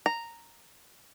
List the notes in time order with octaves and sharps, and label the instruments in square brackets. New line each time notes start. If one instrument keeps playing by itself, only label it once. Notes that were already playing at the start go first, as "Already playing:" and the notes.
[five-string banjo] A#5